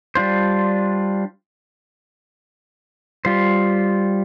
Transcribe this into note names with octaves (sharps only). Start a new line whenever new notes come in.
G3 D4 F4 C5
G3 F4 C5